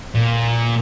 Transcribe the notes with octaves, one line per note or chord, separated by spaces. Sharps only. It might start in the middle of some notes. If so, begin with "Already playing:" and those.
A#2